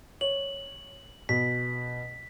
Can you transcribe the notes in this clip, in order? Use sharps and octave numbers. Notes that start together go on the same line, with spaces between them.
C#5 F#7
B2 B6